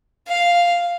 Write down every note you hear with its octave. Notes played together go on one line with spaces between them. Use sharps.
F5